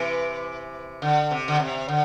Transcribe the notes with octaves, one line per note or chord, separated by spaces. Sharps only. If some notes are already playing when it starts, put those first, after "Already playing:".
Already playing: C3 E3
D3
C3
D3
C3
D3